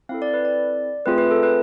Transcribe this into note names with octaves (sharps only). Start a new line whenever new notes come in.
C4 E4 A4 F5
D5
B4
D5
A3 C4 F4 G#4 B4
B4
A4
B4